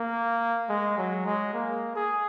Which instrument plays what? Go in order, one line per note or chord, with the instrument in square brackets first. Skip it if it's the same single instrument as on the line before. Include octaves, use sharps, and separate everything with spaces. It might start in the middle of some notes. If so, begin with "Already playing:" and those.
Already playing: [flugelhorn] A#3
G#3
F#3
G#3
A#3
G#4